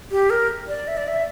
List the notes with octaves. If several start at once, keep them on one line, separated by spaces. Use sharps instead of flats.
G4
A#4
D5
E5
D5
E5